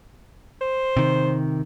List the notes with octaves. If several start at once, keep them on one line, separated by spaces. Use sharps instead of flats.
C5
C3 D#3